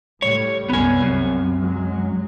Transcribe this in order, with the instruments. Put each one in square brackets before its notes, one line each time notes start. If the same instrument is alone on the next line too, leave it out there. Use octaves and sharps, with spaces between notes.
[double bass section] A2 G3 [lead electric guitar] C#5
[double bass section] C2 F#2 C#4 [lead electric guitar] B3 G#5
[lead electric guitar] F#2 [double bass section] C3
[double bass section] F#3 G#3